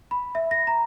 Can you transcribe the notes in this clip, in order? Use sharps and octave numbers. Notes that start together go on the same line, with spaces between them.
B5
E5
A#6
A#5